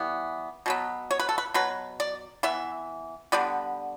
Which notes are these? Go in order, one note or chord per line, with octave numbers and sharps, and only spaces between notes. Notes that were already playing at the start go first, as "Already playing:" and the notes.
Already playing: E3 G3 B3
B2 F#3 B3
C#5
B4
A4
B4
B2 F#3 B4
D5
E3 B3 E5
D3 G3 B3 D5